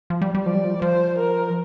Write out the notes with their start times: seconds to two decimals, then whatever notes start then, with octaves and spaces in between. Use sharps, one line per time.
0.10 F3
0.21 G3
0.35 G3
0.46 F3 D5
0.55 G3
0.65 F3
0.82 F3 C5
1.18 A#4